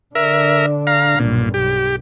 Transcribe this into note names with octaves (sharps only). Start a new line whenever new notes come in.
D3 D4 A#4 E5
F5 A#5
B1 G2 A#2
B1 G4